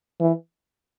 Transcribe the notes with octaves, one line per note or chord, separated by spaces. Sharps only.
E3